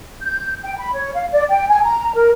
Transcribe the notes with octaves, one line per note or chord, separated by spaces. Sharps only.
G6
G5
B5
C#5
F5
D5
G5
G#5
A#5
A#4